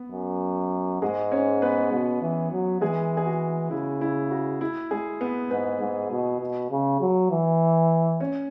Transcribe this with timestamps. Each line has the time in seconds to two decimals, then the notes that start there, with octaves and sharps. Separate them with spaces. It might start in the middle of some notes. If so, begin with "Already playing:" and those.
Already playing: B3
0.12 F#2
1.02 G#2 G#3 G#4
1.32 C#4 C#5
1.62 B3 B4
1.92 B2
2.22 E3
2.52 F#3
2.81 E3 G#3 G#4
3.17 G#4
3.26 F#4
3.71 C#3 E4
4.01 E4
4.31 F#4
4.61 E4
4.91 G#3 G#4
5.21 B3 B4
5.51 G#2 B3 B4
5.81 G#2
6.10 B2
6.41 B2
6.71 C#3
7.01 F#3
7.31 E3
8.20 C#4 C#5